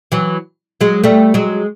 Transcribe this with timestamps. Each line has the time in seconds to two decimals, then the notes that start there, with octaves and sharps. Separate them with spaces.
0.12 E3 F#3
0.81 F#3 G#3
1.04 G3 A3
1.34 F#3 G#3